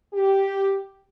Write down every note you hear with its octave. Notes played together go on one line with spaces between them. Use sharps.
G4